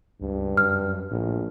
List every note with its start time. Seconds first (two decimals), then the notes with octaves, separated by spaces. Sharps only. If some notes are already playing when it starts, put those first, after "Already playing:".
0.21 C#2 G2
0.57 F#2 F6
1.11 A#1 A2